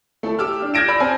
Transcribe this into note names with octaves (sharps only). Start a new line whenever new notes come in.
A3 E4 A4
G4 D6 E6 F6
D4
F6 G6 G#6 A#6 D7 E7
D5 B5 E6
C4 G#5 A5